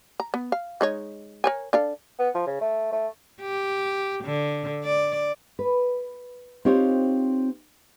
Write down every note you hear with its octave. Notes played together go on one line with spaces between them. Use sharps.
A#5
B3
F5
G#3 D#4 C#5
A#4 C#5 G#5
D4 A4 F5
B3
F3
C#3
A3
A3
G4
D3
D5
B4
C4 D#4 F4 G4 C5 C#5